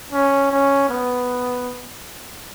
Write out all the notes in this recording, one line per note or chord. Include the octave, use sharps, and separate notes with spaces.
C#4
C#4
B3